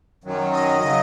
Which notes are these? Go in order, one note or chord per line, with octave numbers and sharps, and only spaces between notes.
F#2 D#3 F#3
D#5
C#3 F#3